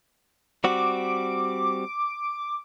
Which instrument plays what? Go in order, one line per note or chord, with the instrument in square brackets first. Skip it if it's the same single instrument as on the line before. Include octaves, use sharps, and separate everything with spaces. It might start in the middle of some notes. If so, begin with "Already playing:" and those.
[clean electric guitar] G3 C4 F#4 [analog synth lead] D6